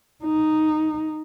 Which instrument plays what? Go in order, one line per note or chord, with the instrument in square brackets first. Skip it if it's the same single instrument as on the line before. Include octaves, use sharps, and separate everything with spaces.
[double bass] D#4